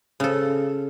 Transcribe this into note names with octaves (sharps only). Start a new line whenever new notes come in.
C#3 A4